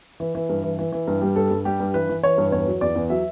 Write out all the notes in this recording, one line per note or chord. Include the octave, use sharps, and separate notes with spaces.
E3
E3
G2
E3
E3
E3
G2
G3
G2 A4
G2
G3 G4
G2
E3 B4
E3
E3 C#5
G2
E2 C#5
F#3
E2 D5
E2
F#3 E5